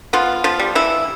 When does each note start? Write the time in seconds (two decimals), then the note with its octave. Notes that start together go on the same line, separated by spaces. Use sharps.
0.13 F3 B3 F4
0.44 F3 F4
0.59 G3
0.75 E3 E4